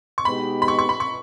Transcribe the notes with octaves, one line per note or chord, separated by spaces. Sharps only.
C#6
B2 G#3 B3 D#4 G4 B5
B5
C#6
C#6
B5
C#6